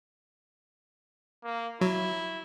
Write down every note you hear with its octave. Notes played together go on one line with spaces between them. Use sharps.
A#3
F#3 E4